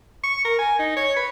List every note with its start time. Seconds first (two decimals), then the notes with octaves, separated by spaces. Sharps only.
0.24 C#6
0.45 A#4
0.59 G#5
0.79 D#4
0.97 C#5
1.16 B4